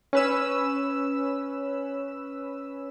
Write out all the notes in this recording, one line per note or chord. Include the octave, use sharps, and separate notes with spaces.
C#4 B4 E6